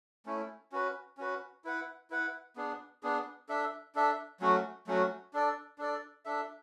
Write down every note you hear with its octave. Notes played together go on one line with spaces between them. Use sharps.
A3 C#4 E4
C#4 F#4 B4
C#4 F#4 B4
E4 B4 F#5
E4 B4 F#5
B3 D4 G#4
B3 D4 G#4
D4 A4 E5
D4 A4 E5
F#3 A3 C#4 F#4
F#3 A3 C#4 F#4
D4 A4 D5
D4 A4 D5
D4 A4 E5